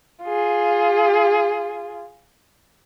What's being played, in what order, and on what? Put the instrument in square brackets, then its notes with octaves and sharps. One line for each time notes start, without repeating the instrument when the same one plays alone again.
[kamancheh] F4 G#4